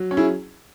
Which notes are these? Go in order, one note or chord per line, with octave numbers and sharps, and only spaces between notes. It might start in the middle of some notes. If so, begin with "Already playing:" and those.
Already playing: F#3
C#4
E4 G#4